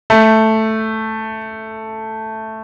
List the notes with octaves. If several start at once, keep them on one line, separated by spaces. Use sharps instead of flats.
A3